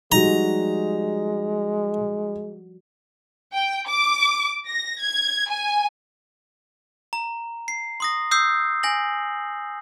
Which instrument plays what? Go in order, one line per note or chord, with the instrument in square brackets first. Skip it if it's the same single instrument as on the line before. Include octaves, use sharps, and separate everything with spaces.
[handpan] F3 G3 F#4 [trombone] G#3 [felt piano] D#4 [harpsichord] A#5
[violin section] G5
D6
A#6
G#6
G#5
[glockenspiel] A#5
C7
C6 D#6 A#6
D#6 E6 G6 C7
G#5 A#6 F#7